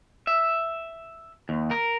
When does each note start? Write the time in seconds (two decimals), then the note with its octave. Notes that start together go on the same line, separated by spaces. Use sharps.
0.27 E5
1.49 D#2
1.71 A#4